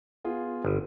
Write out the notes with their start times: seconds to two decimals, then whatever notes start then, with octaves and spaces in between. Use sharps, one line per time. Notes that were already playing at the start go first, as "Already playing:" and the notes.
0.24 B3 F4 G#4
0.65 G1